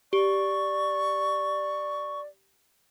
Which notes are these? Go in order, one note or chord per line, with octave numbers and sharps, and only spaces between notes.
G4 D5 C#6